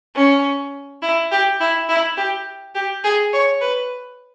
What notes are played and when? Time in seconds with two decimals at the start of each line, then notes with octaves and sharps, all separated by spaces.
0.15 C#4
1.02 E4
1.32 G4
1.60 E4
1.89 E4
2.17 G4
2.75 G4
3.04 G#4
3.33 C#5
3.61 B4